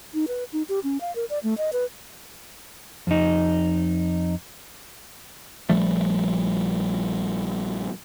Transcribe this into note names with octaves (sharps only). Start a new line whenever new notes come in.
D#4
B4
D#4
G4
C#4
F5
A#4
D5
A3
D#5
B4
F2 D#4
A#1 F3 G3 A3